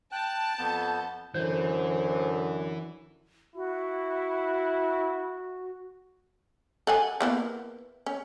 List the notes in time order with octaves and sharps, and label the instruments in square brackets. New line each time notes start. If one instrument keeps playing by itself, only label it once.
[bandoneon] G5 F#6 [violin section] A5
[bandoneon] F2 B3 G6
[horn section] F#2 D3 [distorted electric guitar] E3 [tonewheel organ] C5
[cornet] E4 [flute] F#4
[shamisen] A4 F#5 G#5
A#3 B3 E4
C#4